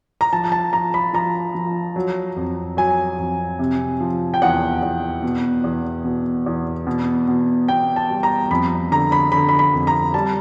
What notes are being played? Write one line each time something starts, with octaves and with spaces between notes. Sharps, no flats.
A#5
F3 A5
A5
F3 A#5
B5
F3 A#5
F3
F#3
F2
F#3 G#5
F2
C3
F3
G5
E2 F#5
E2
B2
E2
B2
E2
B2
B2
B2 G5
A5
G3
A#5
F2 B5
D3 A#5
B5
D3 B5
B5
B5
F2
A#5
G3 A5